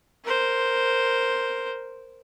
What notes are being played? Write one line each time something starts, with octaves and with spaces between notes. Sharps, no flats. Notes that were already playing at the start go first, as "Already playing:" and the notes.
A#4 C5